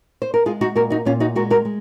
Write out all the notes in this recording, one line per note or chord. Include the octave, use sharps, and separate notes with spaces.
C5
A#4
G#3 F4 G#4
D#4 F#4
A#2 F#4 A#4
D#4 F#4
A#2 C#4 F4
D#4 F#4
G#3 F#4 A#4
F#4 A#4
G#3